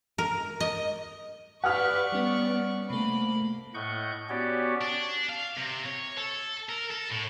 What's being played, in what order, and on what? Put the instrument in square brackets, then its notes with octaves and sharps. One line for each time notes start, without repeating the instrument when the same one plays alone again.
[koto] A#4
D#5
[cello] G4 B4 [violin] D5 C#6 [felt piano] F#5 D#6 F6
[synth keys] G3 C#4 [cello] B3
[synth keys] C3 A3 [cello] A#3 [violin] B5
[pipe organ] A2 D#5 F#5 C#6 G6
B3 C#4 F#4 G4 C#5 D5
[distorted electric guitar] D4
F5
C3
C#5
A4
A#4
A4
A2